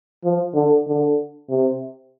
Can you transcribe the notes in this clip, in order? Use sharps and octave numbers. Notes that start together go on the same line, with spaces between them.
F3
D3
D3
C3